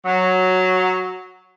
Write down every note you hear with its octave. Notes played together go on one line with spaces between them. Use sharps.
F#3